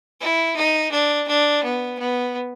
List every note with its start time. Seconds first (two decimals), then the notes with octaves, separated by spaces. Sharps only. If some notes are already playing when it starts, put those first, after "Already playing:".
0.20 E4
0.56 D#4
0.92 D4
1.28 D4
1.63 B3
1.99 B3